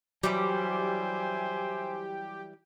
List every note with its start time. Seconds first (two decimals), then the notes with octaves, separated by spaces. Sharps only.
0.23 E3 F#3 G3 G4 C5 E5 G#5